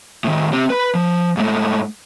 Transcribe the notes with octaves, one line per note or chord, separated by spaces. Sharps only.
A2 D#3
C4 G4
B4 B5
F3
G#2 A3